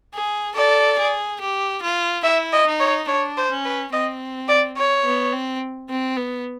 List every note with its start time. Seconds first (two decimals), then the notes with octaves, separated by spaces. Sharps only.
0.14 G#4
0.56 A4 D5
0.99 G#4
1.41 G4
1.82 F4
2.24 E4 E5
2.53 D#5
2.66 D#4
2.80 C#5
3.08 D4 C#5
3.37 C5
3.51 C#4
3.65 B4
3.93 C4 D#5
4.48 D5
4.77 C#5
5.04 B3
5.33 C4
5.90 C4
6.17 B3